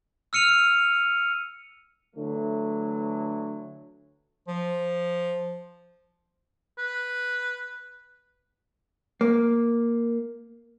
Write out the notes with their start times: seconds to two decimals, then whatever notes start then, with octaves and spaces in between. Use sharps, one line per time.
0.33 E6 F6 C#7 D#7 F7
2.16 D3 E3 F#3 A3
4.47 F3
6.78 B4
9.21 A#3